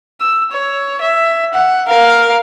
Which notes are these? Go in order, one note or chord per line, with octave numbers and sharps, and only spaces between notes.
E6
C#5
E5
F#5
A#4 F5